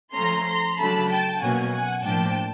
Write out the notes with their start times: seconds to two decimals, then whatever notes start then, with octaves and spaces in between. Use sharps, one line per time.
0.14 F3 A3 C#4 A#5 C6
0.46 A#5 C6
0.78 C#3 F#3 A3 D4 A5 B5
1.09 G5 A5
1.41 B2 F#3 A#3 C#4 F#5 G#5
1.72 F#5 G#5
2.04 A2 F3 A#3 D4 G5 A5